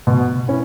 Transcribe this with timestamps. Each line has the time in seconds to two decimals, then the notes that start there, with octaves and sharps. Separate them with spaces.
0.07 B2
0.48 C#4 E4